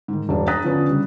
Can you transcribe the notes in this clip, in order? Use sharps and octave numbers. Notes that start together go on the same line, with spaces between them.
G#2 D#3
E1 G2 D4
A#5 D#6 F#6 A6 B6
D3 F3 B3 C#4 D4
C#3 G3